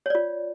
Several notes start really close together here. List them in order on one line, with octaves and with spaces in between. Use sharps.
C#5 D5 F4